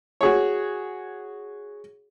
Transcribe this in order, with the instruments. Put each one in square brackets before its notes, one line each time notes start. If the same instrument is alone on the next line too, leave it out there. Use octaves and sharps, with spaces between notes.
[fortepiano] F#4 G#4 C#5